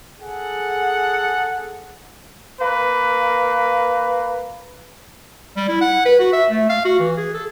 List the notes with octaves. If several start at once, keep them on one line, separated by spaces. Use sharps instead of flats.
G#4 A4 F#5
A#3 B4
G3
E4
F#5
B4
F#4
E5
A3
F5
F#4
E3
G#4
A4